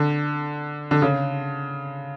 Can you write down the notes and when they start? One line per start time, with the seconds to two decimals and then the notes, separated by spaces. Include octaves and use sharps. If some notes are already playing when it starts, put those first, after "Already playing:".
Already playing: D3
0.91 D3
1.02 C#3